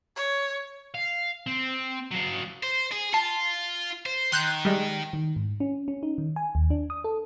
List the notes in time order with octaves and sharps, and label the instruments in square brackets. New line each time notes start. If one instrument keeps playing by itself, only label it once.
[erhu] C#5
[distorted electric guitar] F5
C4
F#3 F5
C5
G#4
[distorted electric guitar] F4 [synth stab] A5
[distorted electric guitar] C5
[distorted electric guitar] D#3 [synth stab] C6 F#6 G6
[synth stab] G3 G#3
[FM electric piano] D#3
G#2
C#4
C#4
D#4
D#3
G#5
D#2
D4
D#6
A4